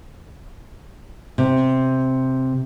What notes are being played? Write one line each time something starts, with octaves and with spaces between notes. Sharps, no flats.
C3